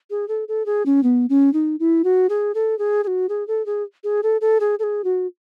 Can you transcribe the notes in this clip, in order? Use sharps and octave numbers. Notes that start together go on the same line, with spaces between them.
G#4
A4
A4
G#4
C#4
B3
C#4
D#4
E4
F#4
G#4
A4
G#4
G#4
F#4
G#4
A4
G#4
G#4
A4
A4
G#4
A4
G#4
F#4